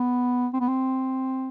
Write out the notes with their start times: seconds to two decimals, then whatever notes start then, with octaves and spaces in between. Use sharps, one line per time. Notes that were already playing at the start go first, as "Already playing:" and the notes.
Already playing: B3
0.53 C4
0.60 B3
0.68 C4